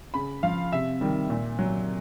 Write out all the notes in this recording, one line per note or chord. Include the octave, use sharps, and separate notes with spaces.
C#3 B5
F3 F5
C3 E5
D#3 G3
A#2
F#3